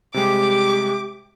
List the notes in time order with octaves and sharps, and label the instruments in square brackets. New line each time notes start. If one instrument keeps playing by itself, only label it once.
[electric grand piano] C3 G3 G#3 [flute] G4 [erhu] D6